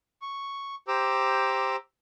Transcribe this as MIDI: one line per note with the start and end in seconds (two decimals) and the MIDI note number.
0.22 0.75 85
0.88 1.76 67
0.88 1.76 72
0.88 1.76 82
0.88 1.76 86
0.88 1.76 88